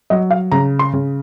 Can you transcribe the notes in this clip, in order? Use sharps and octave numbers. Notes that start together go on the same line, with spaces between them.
F#3 D#5
F5
C#3 A#5
C6
C#3